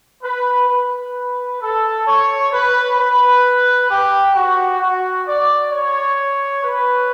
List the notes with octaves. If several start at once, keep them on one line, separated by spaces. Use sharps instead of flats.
B4
B4
A4
C#5
B4
B4
G4
F#4
F#4
D5
C#5
B4